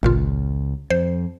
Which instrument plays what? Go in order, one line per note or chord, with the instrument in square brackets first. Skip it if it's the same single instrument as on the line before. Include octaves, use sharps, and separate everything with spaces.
[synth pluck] G#1 A#2 F4 [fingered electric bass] C#2
[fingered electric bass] F2 [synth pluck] C5